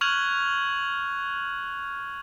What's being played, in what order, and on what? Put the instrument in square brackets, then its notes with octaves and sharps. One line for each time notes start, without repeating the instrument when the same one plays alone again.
[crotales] C#6 F6 F#6 G#6 F7 F#7